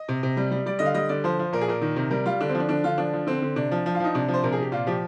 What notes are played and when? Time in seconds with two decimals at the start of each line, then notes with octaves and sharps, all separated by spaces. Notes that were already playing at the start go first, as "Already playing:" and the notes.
Already playing: D#5
0.08 C3
0.23 C3
0.37 G3
0.51 G3
0.66 G3 D5
0.79 D3 D#5
0.86 F5
0.94 G3 D#5
1.09 D3 D5
1.24 F3 C5
1.39 F3
1.52 A#2 A#4
1.61 G#4
1.68 A#2 A#4
1.82 D#3
1.96 C3
2.11 G3 A#4
2.26 G3 F4
2.40 D3 D4
2.49 C4
2.55 F3 D4
2.69 D3 D4
2.84 D3 F4
2.98 F3 D4
3.13 F3
3.27 D3 C4
3.42 D3
3.56 C3 D4
3.71 F3
3.86 F3
3.95 F4
4.00 F3 D#4
4.15 C3 D4
4.28 F3
4.34 C5
4.43 C3 A#4
4.52 G#4
4.57 C3 G4
4.72 A#2 F4
4.87 F3 G4